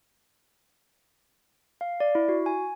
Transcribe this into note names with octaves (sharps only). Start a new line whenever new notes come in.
F5
D5
E4
F#4
G#5